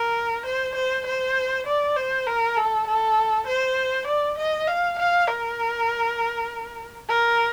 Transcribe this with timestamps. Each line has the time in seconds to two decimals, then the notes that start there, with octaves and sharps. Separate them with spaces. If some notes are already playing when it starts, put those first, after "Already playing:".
Already playing: A#4
0.45 C5
0.75 C5
1.06 C5
1.66 D5
1.96 C5
2.27 A#4
2.56 A4
2.87 A4
3.47 C5
4.07 D5
4.38 D#5
4.67 F5
4.98 F5
5.28 A#4
7.08 A#4